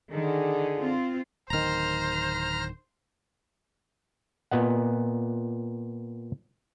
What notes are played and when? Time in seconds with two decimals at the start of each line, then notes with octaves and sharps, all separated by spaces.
0.13 D3 D#3 G#4
0.77 C4 F4
1.50 D1 D#3 C5 A#5 F6
4.51 A#2 B3 D#5 F#5